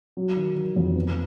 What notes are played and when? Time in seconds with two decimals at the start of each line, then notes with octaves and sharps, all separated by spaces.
0.17 F#3
0.37 D#3
0.56 D#3
0.76 F2
0.96 B3